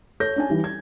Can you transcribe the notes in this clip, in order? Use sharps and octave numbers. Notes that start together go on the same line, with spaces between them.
A4 C#5 G6 A#6
C#4 D4 G#5
E3 G3
G#6